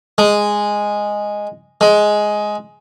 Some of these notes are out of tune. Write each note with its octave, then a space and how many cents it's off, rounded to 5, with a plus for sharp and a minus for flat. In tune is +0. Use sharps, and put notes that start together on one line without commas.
G#3 -5
G#3 +10